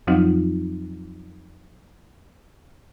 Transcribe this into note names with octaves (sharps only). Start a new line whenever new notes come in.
F2 F3 F#3 C4 D#4 F4